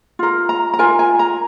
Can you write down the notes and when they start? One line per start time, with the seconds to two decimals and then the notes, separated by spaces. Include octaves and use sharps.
0.19 F4 A#4
0.49 A#5
0.74 A#5
0.79 F4 A#4 G#5
0.99 G#5
1.19 A#5